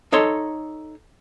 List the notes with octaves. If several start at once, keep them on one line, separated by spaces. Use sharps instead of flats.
D#4 A4 C#5 C6